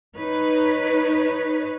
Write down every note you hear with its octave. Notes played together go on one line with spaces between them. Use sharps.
D#4 B4 C#5